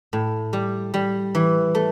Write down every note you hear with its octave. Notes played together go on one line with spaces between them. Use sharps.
A2
G3
G3
E3
A3